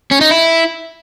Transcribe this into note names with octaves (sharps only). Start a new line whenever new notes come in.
C#4
D#4
E4